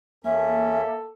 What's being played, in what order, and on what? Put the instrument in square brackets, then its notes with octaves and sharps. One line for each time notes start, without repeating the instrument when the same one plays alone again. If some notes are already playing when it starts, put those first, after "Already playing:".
[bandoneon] E2 C#4 [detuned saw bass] A#3 [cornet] A4 [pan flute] E5